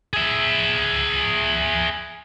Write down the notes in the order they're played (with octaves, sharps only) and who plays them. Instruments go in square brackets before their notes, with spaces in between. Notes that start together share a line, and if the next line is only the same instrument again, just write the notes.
[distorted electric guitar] G#4 E5